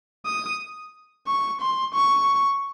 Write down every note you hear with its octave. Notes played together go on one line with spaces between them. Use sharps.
D#6
C#6
C6
C#6